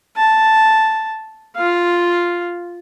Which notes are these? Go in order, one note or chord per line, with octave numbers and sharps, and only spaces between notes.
A5
F4 F5